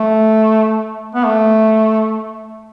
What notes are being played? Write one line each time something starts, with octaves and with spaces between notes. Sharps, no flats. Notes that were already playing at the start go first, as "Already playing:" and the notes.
Already playing: A3
B3
A3